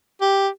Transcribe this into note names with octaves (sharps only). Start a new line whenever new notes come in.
G4